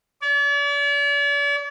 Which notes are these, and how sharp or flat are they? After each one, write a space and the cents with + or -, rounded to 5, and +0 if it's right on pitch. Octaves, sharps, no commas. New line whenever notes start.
D5 -45